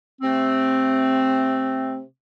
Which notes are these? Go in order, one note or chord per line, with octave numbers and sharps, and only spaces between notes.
C3 A3 C4